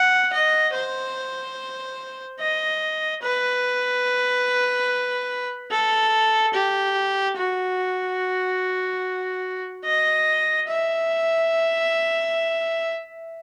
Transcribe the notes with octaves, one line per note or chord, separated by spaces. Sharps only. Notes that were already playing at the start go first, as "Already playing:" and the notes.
Already playing: F#5
D#5
C5
D#5
B4
A4
G4
F#4
D#5
E5